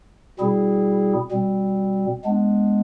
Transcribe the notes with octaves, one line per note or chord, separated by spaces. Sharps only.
B2 G3 C4 E4 G#4
B2 G3 C4
G#3 B3 D4